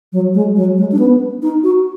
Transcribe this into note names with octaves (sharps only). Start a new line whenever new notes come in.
F#3
G#3
F#3
G#3
D4
B3
D#4
F#4